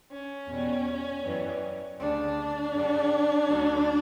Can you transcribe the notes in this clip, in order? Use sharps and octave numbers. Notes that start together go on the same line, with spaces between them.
C#4
E2 B2 G3
F#2 E3 G3
D2 C#3 G3 D4
F#2 C#3 G3
D2 D3 F#3